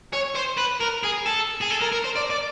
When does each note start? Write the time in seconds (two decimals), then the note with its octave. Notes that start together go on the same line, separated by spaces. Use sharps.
0.13 C#5
0.36 C5
0.58 B4
0.80 A#4
1.03 G#4
1.26 A4
1.61 G#4
1.70 A4
1.81 A#4
1.92 A#4
2.04 C5
2.16 D5
2.30 D5